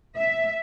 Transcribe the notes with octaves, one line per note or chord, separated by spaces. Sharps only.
E5